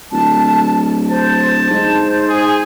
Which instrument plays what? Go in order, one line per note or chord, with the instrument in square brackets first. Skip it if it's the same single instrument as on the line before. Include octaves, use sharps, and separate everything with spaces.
[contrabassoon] D1 [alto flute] A5
[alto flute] C5 [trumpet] A5
[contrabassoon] G#2 [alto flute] C5
[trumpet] G#4